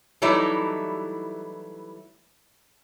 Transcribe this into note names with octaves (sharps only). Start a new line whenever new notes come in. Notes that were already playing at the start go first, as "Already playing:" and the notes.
E3 F#3 G3 A3 D#4 E4